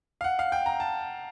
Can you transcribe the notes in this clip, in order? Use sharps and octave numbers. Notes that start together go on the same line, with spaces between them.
F5
F#5
F5
G5
A#5
A5